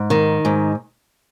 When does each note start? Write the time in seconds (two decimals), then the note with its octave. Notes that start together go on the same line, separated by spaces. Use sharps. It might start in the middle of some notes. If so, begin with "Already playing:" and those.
Already playing: G#2
0.10 D#3
0.45 G#2